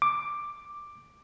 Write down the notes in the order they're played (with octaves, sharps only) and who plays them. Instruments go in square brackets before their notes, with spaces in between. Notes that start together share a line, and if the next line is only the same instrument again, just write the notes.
[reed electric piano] D6